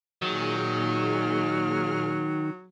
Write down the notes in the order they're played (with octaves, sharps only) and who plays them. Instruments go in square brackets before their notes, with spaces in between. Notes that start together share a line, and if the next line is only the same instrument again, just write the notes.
[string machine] A#2 G#4 F6 [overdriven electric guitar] D#3 [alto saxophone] F#3